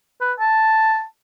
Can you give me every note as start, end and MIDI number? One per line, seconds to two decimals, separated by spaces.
0.21 0.33 71
0.40 1.04 81